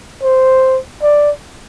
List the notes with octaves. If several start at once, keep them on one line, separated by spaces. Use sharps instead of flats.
C5
D5